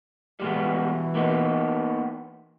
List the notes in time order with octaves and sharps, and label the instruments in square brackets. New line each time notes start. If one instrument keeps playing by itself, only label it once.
[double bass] B2 E3 [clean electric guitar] G3 G#3 B3
[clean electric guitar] A#3 B3 D#4